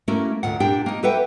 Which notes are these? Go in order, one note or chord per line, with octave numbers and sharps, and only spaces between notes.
A3 A#3 C#4 E4 F#4 A#4
D2 A#2 F#5
A#2 D4 G4 G5
A#3 D#4
G4 A4 B4 E5 F#5 G5